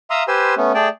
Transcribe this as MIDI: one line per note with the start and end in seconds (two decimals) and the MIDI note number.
0.10 0.23 76
0.10 0.23 77
0.10 0.23 82
0.10 0.23 84
0.10 0.23 87
0.10 0.23 88
0.28 0.54 67
0.28 0.54 71
0.28 0.54 72
0.28 0.54 80
0.28 0.54 84
0.28 0.54 88
0.57 0.72 57
0.57 0.72 59
0.57 0.72 61
0.75 0.88 57
0.75 0.88 68
0.75 0.88 74
0.75 0.88 79
0.75 0.88 81